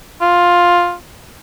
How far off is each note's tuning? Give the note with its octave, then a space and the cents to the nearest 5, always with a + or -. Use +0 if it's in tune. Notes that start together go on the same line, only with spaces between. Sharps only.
F4 +10